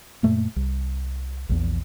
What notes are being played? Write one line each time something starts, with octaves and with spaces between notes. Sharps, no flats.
F#2 A#2 A3 A#3
C2
A#1 E2